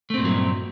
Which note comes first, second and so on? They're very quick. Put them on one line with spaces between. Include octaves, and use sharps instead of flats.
A3 C4 A#2 G2 F#3